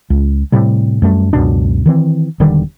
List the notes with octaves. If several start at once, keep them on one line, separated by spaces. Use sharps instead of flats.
C#2
A2 C3 G3
F#2 G3 A3
C#2 F#2 B2 D4
D#3 E3 C4
E1 D3 D#3 G3